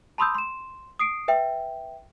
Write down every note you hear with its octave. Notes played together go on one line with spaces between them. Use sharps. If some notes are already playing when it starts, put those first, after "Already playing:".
A5 B5 C6 D#6 E6 G6
C6 E7
D#6 C7 D7
B4 E5 G5